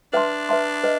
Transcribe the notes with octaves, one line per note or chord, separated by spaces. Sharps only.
D4 B4 E5 A5 C6
B4 E5 A5 C6
B4 D#5